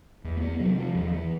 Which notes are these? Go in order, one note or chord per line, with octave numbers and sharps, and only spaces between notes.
E2
A#3
B3
C3 F#3
F3
E2 F3
E3